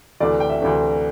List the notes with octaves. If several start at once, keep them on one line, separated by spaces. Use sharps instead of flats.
D2 C3 E3 A3 D5
G5
E5
D2 C3 E3 A3